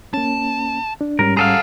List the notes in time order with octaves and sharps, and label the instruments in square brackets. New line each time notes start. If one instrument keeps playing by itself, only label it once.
[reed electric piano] A#3 C#4 [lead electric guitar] A5
[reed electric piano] D4
[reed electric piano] G#2 G3 C#4 [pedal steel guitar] A#4
[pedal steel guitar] G#4 A4 F5 [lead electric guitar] F#5 A#5